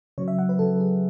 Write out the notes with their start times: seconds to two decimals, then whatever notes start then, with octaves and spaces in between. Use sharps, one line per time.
0.18 C#3 F#3 C#5
0.28 E5
0.39 F#5
0.49 B4
0.59 C#3 F#3 A4
0.80 G#4